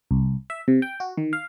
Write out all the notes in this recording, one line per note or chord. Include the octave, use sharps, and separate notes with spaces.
C2
E5
C3
G5
F#4
D#3
F5